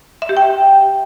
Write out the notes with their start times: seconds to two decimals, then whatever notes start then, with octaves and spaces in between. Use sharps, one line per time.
0.22 E5
0.29 G4
0.37 G5